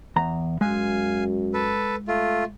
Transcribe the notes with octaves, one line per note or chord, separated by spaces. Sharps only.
E2 A#5
F#2 G#3 F5 G#5
A4 B4
A3 F4